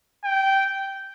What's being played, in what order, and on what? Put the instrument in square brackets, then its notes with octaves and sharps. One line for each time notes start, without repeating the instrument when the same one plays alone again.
[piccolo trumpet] G5